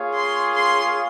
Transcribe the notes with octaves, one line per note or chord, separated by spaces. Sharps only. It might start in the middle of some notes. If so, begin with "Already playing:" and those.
Already playing: A#3 F4 G#4 C#5 F5
C6
C6